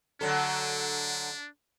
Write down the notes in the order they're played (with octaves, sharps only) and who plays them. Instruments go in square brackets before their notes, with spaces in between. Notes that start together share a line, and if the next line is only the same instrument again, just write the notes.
[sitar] D3 F#3 A4 [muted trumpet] D4